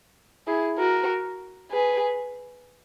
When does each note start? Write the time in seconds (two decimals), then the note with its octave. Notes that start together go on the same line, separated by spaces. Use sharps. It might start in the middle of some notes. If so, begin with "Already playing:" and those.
0.47 E4 G#4
0.78 F#4 A#4
1.70 G#4 B4